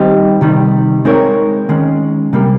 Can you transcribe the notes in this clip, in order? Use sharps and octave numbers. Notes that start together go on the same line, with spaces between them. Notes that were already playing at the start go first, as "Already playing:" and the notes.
Already playing: D#3 G3 C4 D#4 G4
C3 D#3 G3
G#3 C4 D#4 A#4 C#5
D#3 G#3 C#4
C3 G3 A#3